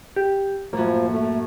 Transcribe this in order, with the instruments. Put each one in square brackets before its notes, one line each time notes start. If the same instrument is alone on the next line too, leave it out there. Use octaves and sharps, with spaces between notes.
[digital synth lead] G4
[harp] F#2 A2 [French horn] F3 [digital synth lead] A#3
[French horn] A3